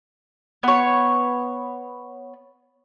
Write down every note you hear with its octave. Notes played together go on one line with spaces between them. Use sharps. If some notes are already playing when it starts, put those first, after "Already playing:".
B3 C#5